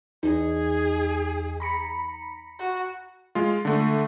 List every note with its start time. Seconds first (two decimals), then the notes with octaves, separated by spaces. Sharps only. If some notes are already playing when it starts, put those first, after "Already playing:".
0.23 E2 D#4 G#4
1.60 A#5 B5 C#7
2.59 F#4
3.35 G#3 F4
3.65 D3 A3